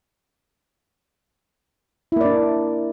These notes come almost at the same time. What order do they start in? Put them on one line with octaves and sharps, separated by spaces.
E4 A#3 D5 D4